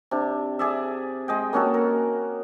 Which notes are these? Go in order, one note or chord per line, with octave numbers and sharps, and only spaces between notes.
C3 D4
G#4 D5 E5
G#3 D#5 G5
A#3 C#4 F#4 A4
A#4